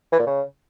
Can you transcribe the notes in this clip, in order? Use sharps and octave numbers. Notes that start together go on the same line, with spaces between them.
E3
A#2
C#3